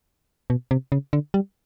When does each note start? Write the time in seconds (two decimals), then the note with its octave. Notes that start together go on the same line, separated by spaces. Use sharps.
0.50 B2
0.71 C3
0.92 C#3
1.13 D3
1.34 G3